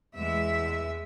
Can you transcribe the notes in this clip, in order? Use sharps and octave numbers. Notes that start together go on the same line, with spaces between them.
E2 G#3 E5